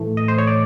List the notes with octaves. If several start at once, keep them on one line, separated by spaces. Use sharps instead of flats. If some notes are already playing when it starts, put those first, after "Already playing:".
Already playing: A2 E3 A3
D#5
C5
C#5
D5